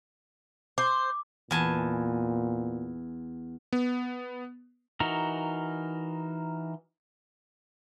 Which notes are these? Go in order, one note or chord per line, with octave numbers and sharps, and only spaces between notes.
C5 D6
E2 A#2 G#5 A5
B3
E3 D#4 F#4 A#4